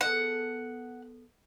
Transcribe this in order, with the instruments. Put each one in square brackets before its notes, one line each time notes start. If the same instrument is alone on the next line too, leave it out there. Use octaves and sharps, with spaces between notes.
[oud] B3 G#4 A4 [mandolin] F#5